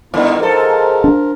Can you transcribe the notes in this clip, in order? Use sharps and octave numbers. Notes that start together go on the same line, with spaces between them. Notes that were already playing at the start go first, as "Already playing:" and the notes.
G2 D3 D#3 B3 E4 F4
G#2 F3 F4 A4 A#4
D4